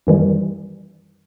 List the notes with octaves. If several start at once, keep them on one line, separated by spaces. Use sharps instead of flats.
F#2 D#3 E3 G3